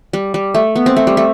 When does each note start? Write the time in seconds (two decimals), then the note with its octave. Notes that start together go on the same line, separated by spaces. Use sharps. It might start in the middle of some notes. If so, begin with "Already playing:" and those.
0.13 G3
0.34 G3
0.55 A3
0.76 B3
0.86 C4
0.97 A3
1.07 G3
1.17 A3